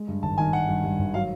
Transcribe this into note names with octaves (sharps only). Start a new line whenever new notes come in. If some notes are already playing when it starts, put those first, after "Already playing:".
Already playing: G#3
G2
G#1 A5
D#3 G#5
D#3 F#5
G2
G2
G#1
F#3 F5